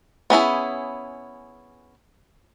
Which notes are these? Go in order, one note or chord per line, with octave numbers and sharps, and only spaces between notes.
B3 C#4 E4 G#4